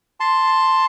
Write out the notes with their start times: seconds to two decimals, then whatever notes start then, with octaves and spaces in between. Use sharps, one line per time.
0.20 A5 C6